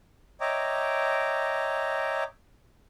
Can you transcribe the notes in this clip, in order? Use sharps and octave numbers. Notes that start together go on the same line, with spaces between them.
C#5 D#5 E5 G5 A#5 D6